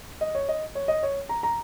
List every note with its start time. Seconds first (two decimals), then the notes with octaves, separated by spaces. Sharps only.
0.21 D#5
0.35 C#5
0.48 D#5
0.75 C#5
0.88 D#5
1.03 C#5
1.29 A#5
1.43 A#5